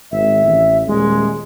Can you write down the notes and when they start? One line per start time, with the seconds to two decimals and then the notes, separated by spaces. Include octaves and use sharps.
0.11 G#1 E5
0.45 A1
0.87 D#1 G#3